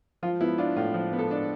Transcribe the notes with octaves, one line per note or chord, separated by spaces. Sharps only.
F3 F4
B3 E4
D4 F4
A2 F4
F3
B3
A4
D4